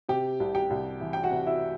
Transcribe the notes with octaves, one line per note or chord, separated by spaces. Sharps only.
C3 G4 G5
C2
G4 G5
C2
E3
G5
F#4 F#5
C3
E4 E5